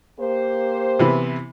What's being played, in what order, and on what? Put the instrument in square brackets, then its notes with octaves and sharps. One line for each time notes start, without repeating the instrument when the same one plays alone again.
[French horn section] A#3 G4 C5
[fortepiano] C3 E3 B3